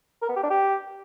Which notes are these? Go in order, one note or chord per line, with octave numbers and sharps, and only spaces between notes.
A#4
B3
G4
D4
G4